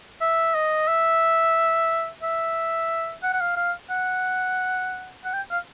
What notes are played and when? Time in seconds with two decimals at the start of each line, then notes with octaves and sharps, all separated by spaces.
0.21 E5
0.55 D#5
0.88 E5
2.23 E5
3.23 F#5
3.34 F#5
3.41 F5
3.57 F5
3.90 F#5
5.25 F#5
5.34 G5
5.51 F5